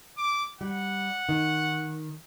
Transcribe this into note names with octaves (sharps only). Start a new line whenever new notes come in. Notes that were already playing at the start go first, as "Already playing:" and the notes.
D6
G3 F#5
D#3